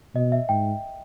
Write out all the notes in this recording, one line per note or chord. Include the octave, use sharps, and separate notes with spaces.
B2 D#5
E5
G#2 G5